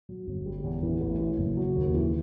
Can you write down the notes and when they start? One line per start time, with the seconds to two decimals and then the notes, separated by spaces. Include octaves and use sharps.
0.09 F#3
0.27 G1
0.46 G3
0.64 E2
0.83 E3
1.00 A1
1.19 E3
1.38 F#1
1.57 F#3
1.76 D#2
1.94 E3